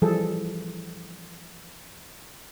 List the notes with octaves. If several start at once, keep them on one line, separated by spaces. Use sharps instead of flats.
E3 F3 G3 G#4 A4